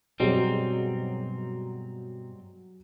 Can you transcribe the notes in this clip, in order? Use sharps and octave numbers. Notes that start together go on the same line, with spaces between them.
G2 B2 F#3 G3 C4 D#4 G#4